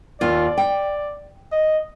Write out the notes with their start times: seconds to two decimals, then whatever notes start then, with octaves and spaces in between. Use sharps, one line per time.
0.21 D#2 F4 D5
0.57 G5
1.52 D#5